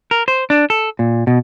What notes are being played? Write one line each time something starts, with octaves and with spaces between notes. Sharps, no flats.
A#4
C5
D4
A4
A#2
B2